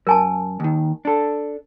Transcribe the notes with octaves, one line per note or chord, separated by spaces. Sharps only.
F#2 A#4 G#5 A5
D#2 D#3
D4 A4